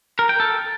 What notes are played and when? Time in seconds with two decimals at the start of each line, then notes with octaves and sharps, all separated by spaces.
0.19 A#4
0.29 G5
0.40 A4